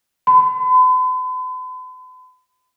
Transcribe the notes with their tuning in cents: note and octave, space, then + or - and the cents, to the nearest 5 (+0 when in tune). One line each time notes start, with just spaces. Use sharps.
B5 +45